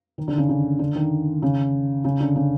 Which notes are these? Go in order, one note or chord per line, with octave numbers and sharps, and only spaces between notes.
D#3
D3
C#3
C#3
D3
D#3
C#3
C#3
D3
C#3